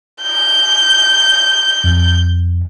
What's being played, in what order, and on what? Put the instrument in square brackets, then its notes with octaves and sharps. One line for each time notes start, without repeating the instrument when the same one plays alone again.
[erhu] G6
[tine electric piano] F2